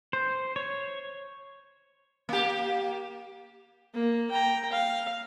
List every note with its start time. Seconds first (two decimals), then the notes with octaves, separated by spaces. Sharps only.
0.13 C5
0.56 C#5
2.29 A#3 G4
3.94 A#3
4.30 G5 A#5
4.72 F5